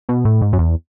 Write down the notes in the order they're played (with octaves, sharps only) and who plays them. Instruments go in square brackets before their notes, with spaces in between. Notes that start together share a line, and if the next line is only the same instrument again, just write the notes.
[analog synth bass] B2
A2
G#2
F#2
E2